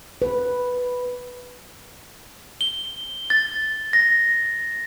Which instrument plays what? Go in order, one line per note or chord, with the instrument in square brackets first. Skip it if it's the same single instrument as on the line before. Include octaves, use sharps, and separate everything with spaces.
[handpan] B4
[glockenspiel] G7
A6
A#6